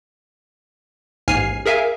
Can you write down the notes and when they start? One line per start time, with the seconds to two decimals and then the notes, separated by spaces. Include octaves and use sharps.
1.28 A1 D#2 G#2 G#5 F6 C7
1.66 G#4 A#4 E5 F5 G#5